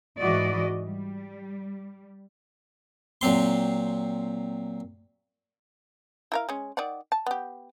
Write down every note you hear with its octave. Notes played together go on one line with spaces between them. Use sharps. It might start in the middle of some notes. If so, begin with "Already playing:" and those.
G#2 E3 F#4 D5 D#5
G3
A#2 F#3 C4 C6
E4 A#4 F5
G#3 C#4
D#3 D5 F#5
A5
B3 G4